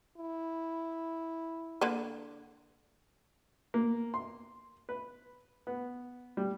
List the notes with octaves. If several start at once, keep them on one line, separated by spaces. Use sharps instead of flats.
E4
D3 A#3 B4
A#3
C6
B4
B3
G3